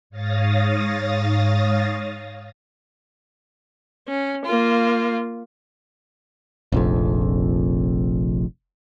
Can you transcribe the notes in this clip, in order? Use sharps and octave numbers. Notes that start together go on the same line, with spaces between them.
G#2 C#5 F5 D#6 A6 A#6
C#4
A#3 F4
F1 A#1 F2